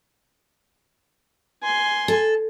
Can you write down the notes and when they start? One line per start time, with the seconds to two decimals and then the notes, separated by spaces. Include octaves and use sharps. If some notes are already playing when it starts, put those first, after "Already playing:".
1.63 G#5 C6
2.08 A4